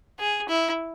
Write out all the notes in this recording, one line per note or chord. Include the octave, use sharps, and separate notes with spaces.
G#4
E4